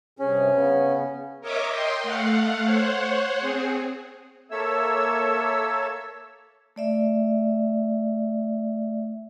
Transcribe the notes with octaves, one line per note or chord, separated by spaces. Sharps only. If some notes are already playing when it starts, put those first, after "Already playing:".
G2 C3 C#4 G#4
C#3 B3
A#4 C#5 D#5 E5 D6
D#5 G5 C6
A3 F5 F#5
C5 C#5 F#5
C4 G#4
A#3 A4 C#5 E5 E6
A3 D5 E5